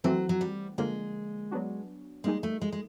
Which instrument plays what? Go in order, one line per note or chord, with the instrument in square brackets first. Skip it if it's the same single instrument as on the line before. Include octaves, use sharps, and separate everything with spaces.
[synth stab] E3 A3 C4 [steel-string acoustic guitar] F#3
[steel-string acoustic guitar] F#3
G3
[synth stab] D3 F3 A#3 [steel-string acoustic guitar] G#3
[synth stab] F#3 B3 D4 F#4
[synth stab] G3 A#3 D#4 G#4 [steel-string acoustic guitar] G#3
[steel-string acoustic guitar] A3
G#3
G#3